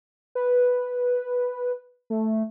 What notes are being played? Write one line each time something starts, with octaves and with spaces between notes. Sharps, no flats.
B4
A3